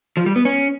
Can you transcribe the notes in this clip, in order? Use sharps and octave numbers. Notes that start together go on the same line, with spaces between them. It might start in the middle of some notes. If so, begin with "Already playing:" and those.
F3
G3
B3
C#4